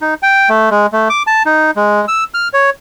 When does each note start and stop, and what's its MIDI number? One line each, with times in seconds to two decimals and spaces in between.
0.02 0.14 63
0.23 0.49 79
0.49 0.69 57
0.70 0.86 56
0.93 1.09 57
1.10 1.23 86
1.27 1.43 81
1.46 1.71 63
1.76 2.05 56
2.08 2.24 88
2.34 2.48 89
2.54 2.70 73